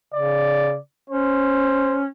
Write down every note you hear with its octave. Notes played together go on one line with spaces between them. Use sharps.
C#3 D5
C#4 C5